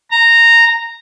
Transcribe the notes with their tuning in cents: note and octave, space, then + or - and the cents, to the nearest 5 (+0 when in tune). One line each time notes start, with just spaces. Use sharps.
A#5 -10